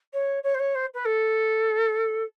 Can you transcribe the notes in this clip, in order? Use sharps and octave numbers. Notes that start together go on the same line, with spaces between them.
C#5
C#5
C5
C#5
C5
B4
A4